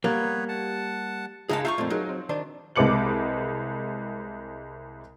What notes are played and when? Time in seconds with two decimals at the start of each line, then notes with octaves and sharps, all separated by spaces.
0.04 G3 A#3 B3 B4 C#5
0.48 F#5 A5
1.49 C#2 G2 D#4 G#4 A#4 E5 F5 A5
1.65 F4 E5 A#5 C#6 G6 C7
1.78 F2 A#2 A3 C4
1.90 F#3 D#4 G#4 A#4
2.09 C4
2.29 D#3 D4 C5
2.76 C2 G#3 B4 D6 C#7 F#7